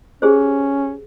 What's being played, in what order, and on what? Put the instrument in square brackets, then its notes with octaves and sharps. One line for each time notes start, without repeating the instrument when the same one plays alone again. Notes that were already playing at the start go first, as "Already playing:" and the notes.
[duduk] C#4 [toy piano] G4 G#4 C5